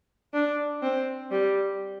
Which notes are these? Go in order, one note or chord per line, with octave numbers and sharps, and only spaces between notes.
D4
C4
G3